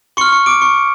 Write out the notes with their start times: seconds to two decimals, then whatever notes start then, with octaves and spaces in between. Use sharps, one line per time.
0.17 C6 C#6 F6 C#7
0.32 C#6 C#7
0.46 D6 D7
0.61 C#6 C#7